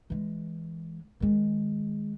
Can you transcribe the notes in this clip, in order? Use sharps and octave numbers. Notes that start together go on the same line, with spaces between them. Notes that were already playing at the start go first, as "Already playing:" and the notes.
E3 G#3
D#3 G#3